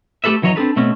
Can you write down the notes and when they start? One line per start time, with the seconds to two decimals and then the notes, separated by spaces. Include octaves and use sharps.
0.24 A3 G4 A4 B4 E5
0.42 F#2 E3 F#3 C#5 D#5 A#5
0.56 C4 D4 G#4 A4 B4
0.76 B2 A3 C4 C#4